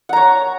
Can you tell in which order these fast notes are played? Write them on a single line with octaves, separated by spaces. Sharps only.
F#5 A#5 C#5